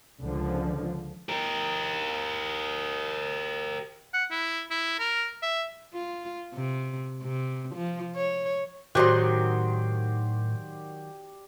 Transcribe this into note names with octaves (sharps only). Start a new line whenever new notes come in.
C#2 D3 F3
G4 A#4
F#5
E4
E4
A#4
E5
F4
C3
C3
F3
C#5
A2 D#3 F#3 F#4 G4 C5 D5 C6